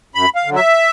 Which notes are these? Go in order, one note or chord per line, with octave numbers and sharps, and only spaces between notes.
F#2 B5
F5
D3 F#3
E5